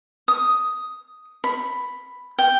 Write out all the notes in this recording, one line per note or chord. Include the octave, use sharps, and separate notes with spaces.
D#6
B5
G5